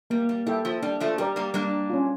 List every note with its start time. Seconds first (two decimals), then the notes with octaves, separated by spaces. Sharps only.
0.10 G3 A#3
0.29 G3
0.47 G3 E4 A4 E5 G5
0.65 F3
0.82 G3 D4
1.00 F3 A3
1.18 G3 G4 A#4 D5
1.36 G3 A#3
1.54 G3 A#3 D4
1.90 C#4 F4